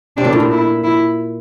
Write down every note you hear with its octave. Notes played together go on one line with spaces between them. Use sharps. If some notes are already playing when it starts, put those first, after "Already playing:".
C3 D4
A#2
A2
A#2
E4
E4